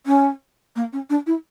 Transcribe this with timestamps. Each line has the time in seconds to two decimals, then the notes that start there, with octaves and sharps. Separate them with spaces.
0.06 C#4
0.76 A#3
0.93 C#4
1.10 D4
1.26 E4